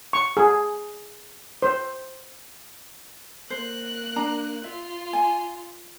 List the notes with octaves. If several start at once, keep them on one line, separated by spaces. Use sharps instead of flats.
C#6
G#4
C5
A#3 C5 F#6
D4 A#5
F4 E5
G#5